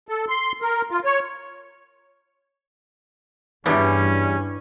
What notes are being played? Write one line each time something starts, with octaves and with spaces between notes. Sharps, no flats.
A4
C6
A#4
F4
C#5
E2 G2 E3 G3 C#4 D4